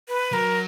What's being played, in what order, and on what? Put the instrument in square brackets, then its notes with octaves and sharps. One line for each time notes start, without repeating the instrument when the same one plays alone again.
[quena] B4
[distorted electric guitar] F#3 [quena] A#4